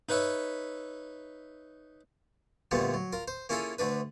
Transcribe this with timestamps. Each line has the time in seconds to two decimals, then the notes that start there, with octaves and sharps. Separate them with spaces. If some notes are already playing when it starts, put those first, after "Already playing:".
0.09 D#4 B4 C#5 E5
2.71 D2 A#2 G3 A3 B3
2.94 F#3
3.13 F4 A#4
3.28 C5
3.49 A#3 C#4 E4 F4 G#4 A4
3.79 D2 A3 D4 B4